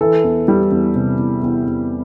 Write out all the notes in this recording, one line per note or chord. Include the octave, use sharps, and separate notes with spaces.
E3 A4
E2
G3
E2
C3
E2
E2
E2